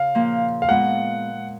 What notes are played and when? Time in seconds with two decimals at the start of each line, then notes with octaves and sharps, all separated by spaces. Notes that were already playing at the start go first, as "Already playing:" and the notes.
Already playing: C#3 F5
0.15 A#2 F3 A#3
0.62 F5
0.68 A#2 G#3 B3 F4 F#5